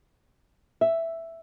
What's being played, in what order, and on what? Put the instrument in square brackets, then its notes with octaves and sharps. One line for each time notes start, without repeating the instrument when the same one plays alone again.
[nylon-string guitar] E5